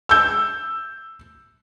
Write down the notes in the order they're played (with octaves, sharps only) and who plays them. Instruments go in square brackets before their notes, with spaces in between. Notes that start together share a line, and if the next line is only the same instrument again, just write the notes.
[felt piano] E6 G6